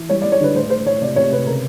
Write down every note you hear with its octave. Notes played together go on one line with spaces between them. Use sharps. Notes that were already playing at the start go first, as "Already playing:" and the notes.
Already playing: E3
G3 C#5
D5
G3
C#5
D3 B4
A2 C5
A2 C5
A2 C#5
C3 D5
C3 C#5
C3 B4
C#3 A#4